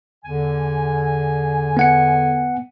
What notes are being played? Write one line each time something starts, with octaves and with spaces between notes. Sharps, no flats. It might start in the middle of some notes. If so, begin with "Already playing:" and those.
E2 D3 G#5
B3 F#5 C#7